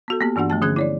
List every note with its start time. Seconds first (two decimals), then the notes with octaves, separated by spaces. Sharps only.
0.08 B3 F#4 A4
0.21 A#3 B3 G4
0.36 G2 E3 D4 F#4 F#5
0.50 F3 A3 A5
0.62 D3 C#4 G#4 F#6 G#6
0.76 E4 C#5 D5